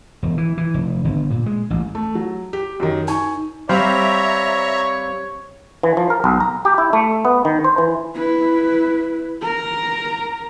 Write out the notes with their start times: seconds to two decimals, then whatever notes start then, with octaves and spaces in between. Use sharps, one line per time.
0.23 E1
0.38 E3
0.57 E3
0.74 F1
1.04 G1
1.30 A#2
1.46 G#3
1.70 A1
1.95 A3
2.15 F#3
2.53 G4
2.80 F#2 D#3
3.08 D#4 G#5 C#6
3.69 G3 C4 C5 C#5 E5 F5 A#5 B5
5.83 E3
5.97 F3
6.10 A#4
6.24 B1
6.40 A#5
6.65 G4
6.78 E4
6.93 A3
7.25 B3
7.45 D#3
7.64 C5
7.78 E3
8.15 E4 B4
9.41 A#4 A#5